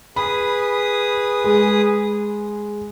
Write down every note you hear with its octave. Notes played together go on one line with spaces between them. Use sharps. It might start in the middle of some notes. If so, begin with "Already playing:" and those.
G#4 B4 B5 D#6
G#3